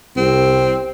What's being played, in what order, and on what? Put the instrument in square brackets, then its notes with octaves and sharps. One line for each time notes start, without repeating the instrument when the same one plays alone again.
[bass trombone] C2 [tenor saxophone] C4